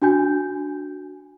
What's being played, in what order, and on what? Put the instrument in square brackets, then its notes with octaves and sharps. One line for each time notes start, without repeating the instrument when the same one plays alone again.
[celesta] D4 F#4 G#5 G6